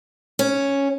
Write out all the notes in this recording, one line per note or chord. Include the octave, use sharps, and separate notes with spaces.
C#4